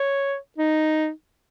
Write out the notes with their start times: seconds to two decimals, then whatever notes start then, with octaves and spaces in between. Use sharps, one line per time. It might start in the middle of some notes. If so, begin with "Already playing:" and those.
Already playing: C#5
0.58 D#4